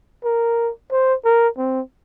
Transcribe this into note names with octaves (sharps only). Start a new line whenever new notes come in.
A#4
C5
A#4
C4